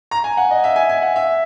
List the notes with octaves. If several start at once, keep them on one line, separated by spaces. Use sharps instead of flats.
A#5
G#5
F#5
D#5
E5
G#5
G#5
F#5
E5